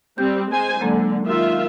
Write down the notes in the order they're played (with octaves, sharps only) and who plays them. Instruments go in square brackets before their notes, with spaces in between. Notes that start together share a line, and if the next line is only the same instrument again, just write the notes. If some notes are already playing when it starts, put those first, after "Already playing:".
[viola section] G3 C4 [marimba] G6
[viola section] G#3 C5 G#5
[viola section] D3 [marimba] F#3 G#3 A#3
[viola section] D#3 F4 E5